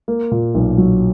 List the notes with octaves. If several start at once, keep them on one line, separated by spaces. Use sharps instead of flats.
A#3
A#2
B1
F#3